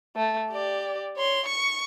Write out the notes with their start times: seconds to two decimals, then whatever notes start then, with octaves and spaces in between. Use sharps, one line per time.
0.16 A3
0.51 G4 D5
1.17 C#5 C6
1.46 C#6 C#7